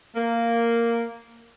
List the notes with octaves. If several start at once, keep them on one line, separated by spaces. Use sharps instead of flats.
A#3